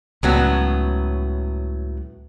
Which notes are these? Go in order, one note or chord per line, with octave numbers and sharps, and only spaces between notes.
C#2 A2 C#3 F#3 B3